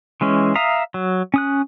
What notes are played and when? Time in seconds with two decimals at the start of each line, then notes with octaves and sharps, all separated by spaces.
0.21 E3 G#3 C#4
0.55 E5 F5 A#5 D#6
0.94 F#3
1.34 C#4 D#6 F#6